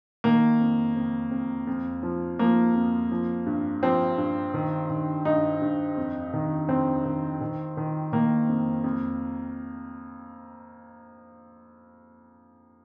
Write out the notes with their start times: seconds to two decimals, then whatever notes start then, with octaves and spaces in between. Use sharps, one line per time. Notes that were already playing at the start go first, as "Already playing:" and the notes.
0.24 D#3 A#3
0.60 F2
0.96 F2
1.31 F2
1.67 F2
2.03 F3
2.39 F3 A#3
2.75 F2
3.11 F3
3.46 G2
3.82 F3 C4
4.18 G2
4.54 D#3
4.90 D#3
5.25 G2 D#4
5.62 G2
5.97 F2
6.34 D#3
6.69 F2 C4
7.05 D#3
7.41 D#3
7.77 D#3
8.13 D#3 A#3
8.49 F2
8.84 F2